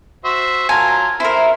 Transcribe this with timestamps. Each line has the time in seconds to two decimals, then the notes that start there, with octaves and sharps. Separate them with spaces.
0.24 F#4 C5 E5
0.69 F#3 F4 A#4 G#5
1.20 E4 A#4 C5